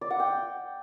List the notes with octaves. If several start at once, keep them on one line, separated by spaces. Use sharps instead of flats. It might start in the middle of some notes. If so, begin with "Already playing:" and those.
D5
F#5
G5